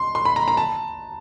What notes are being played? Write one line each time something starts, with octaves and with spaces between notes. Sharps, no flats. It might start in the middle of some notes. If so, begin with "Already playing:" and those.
Already playing: C6
C6
B5
A#5
A#5
A5